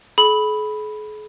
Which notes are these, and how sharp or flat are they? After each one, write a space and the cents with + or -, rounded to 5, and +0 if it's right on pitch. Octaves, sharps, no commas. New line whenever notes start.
G#4 +45 B5 +0